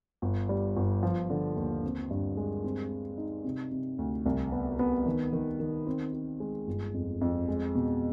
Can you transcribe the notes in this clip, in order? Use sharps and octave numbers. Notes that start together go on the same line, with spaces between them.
G1
G3
G1
F3
D3
D#2
C4
G2
G#3
C4
G3
D#4
C3
C3
D2
C2
B3
B3
D#3
D#3
D#3
C4
C4
G#3
G1
F2
F2
G#3
B2